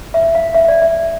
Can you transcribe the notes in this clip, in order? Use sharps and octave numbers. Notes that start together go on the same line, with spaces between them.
E5
F5
E5
D5
E5